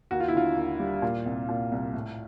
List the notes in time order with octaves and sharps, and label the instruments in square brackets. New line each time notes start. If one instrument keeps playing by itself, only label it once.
[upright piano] D#2 F#4
F4
E4
D3 F4
D#2
G3
A#2
C2
A#2
C2
A2